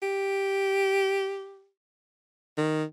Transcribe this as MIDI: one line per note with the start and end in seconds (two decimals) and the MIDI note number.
0.02 1.69 67
2.58 2.84 51